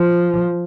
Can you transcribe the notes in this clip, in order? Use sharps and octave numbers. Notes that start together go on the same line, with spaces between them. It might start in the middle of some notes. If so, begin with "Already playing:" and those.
Already playing: F3